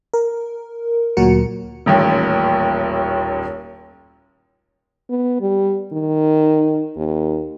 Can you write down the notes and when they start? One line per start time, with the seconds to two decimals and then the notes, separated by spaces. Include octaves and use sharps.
0.14 A#4
1.17 D2 A#2 F#3 F#4 A#4 C#7
1.86 D#1 A1 D#2
5.10 B3
5.41 G3
5.92 D#3
6.96 D#2